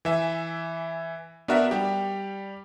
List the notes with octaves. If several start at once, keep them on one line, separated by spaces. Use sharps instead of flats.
E3 E5 G#5
B3 D4 F#4 A#4 E5 F#5
G3 G4